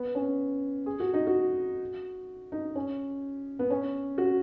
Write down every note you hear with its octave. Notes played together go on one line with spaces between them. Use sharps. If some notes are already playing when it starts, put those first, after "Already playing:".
Already playing: B3
C#4
G#4
F#4
D#4
F#4
D#4
C#4
B3
C#4
F#4